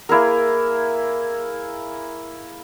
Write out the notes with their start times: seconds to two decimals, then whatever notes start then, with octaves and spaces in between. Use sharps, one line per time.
0.09 A#3 E4 G#4 A#4